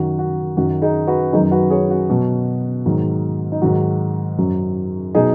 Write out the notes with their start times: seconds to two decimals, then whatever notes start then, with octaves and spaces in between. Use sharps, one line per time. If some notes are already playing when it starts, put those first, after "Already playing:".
Already playing: F#2 D#3 F#3 F#4
0.19 F#4
0.57 F#2 D#3 F#3 F#4
0.82 D#4 G#4
1.07 F#4 B4
1.33 F#2 D#3 F#3 D#4 G#4
1.51 F#4 B4
1.70 G#4 C#5
1.90 F#4
2.10 B2 F#3
2.86 G#2 D#3 F#3
3.52 D#4
3.62 G#2 D#3 F#3 F#4
4.38 F#2 F#3
5.15 B2 F#3 D#4 G#4